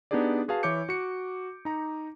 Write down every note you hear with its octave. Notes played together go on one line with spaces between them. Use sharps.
B3 D4 D#4 G4 G#4 D5
F#4 G#4 B4 F5 A5
E3 E4 C#5 D6 G6 C#7
F#4 C#7
D#4 A#5